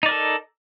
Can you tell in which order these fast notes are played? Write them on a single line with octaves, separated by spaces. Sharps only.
D#4 D5 A#4 A4